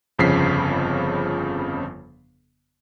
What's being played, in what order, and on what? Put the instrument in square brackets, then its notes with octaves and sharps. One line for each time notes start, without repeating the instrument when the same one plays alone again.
[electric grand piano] G1 F2 C#3 F3 B6 C7